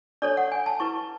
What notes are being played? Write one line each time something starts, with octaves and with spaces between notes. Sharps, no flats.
D4 A4 C#5 D5
F#5
G#5
A5
E4 B4 C#6